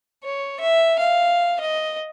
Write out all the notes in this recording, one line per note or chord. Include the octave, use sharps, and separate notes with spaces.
C#5
E5
F5
D#5